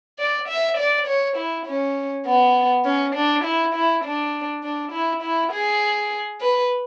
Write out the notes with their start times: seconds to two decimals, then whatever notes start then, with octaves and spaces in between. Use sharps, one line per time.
0.19 D5
0.48 E5
0.78 D5
1.07 C#5
1.37 E4
1.66 C#4
2.26 B3
2.85 C#4
3.15 D4
3.44 E4
3.74 E4
4.04 D4
4.63 D4
4.92 E4
5.23 E4
5.52 G#4
6.41 B4